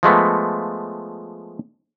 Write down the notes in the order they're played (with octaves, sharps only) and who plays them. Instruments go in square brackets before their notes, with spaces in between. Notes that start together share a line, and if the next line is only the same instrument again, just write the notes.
[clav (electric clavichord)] F3 G#3 A3 B3